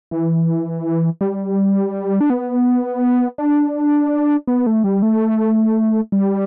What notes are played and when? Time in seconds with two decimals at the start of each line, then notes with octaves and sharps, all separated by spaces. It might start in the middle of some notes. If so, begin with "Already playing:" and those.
0.11 E3
1.21 G3
2.21 D4
2.30 B3
3.38 D4
4.47 B3
4.67 A3
4.84 G3
5.02 A3
6.12 G3